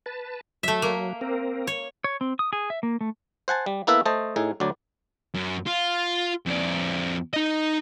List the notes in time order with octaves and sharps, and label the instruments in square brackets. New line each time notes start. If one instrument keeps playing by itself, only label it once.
[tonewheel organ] B4 A5
[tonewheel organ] F#3 [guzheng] A3 E5
[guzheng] A#3
[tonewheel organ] C4 A#4
[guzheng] C#5
[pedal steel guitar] C#5
C4
D#6
G#4
E5
A#3
A3
[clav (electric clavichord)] C5 F#5 G#5 A5
G3
A#3 B3 E4 A4 B4 E5
A3 C5 D#5 A5
A2 D#4 G#4
D2 F#3 D5
[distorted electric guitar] F#2
F4
F2 D5
D#4 D#5